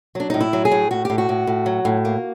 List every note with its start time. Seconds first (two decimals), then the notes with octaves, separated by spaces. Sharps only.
0.15 F#3 D4
0.30 A2 D#4
0.41 E4
0.53 F#3
0.65 G#4
0.72 A2
0.91 A2 F#4
1.05 A2 G4
1.18 F#4
1.29 A2
1.47 A2
1.66 F#3
1.85 A2
2.05 A#3